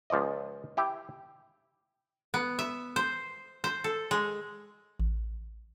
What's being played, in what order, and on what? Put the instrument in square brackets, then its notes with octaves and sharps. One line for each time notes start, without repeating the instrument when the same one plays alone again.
[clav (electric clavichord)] C#2 F3 D5 D#5
E4 G4 G5
[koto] B3
E5
C5
C5
A4
G#3
[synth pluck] A1